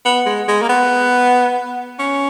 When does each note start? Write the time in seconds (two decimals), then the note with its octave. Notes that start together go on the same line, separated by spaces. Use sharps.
0.06 B3
0.26 G#3
0.48 G#3
0.62 A#3
0.69 B3
1.99 C#4